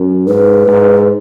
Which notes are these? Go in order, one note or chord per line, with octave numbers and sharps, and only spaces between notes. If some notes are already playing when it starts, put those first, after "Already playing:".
Already playing: F#2
G#2 B4
G#2